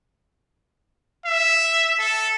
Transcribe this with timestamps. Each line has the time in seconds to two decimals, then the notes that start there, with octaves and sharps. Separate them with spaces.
1.26 E5
1.99 A4